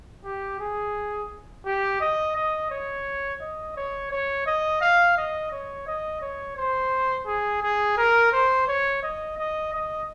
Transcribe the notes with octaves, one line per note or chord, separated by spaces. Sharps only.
G4
G#4
G4
D#5
D#5
C#5
D#5
C#5
C#5
D#5
F5
D#5
C#5
D#5
C#5
C5
G#4
G#4
A#4
C5
C#5
D#5
D#5
D#5